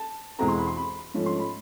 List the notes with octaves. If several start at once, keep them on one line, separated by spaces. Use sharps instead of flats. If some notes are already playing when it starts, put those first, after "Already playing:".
Already playing: A5
E2 B2 G#3 C4 A#5
C6
B5
C6
B5
G#2 F3 A3 C#4
C6
B5